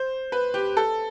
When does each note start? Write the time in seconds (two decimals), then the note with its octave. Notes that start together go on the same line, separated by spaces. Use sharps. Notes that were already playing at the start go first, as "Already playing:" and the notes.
Already playing: C5
0.32 B4
0.54 G4
0.77 A4